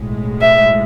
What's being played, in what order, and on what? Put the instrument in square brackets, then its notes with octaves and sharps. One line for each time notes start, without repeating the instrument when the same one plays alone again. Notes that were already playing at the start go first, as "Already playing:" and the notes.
Already playing: [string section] B1 A2 G#3
[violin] E5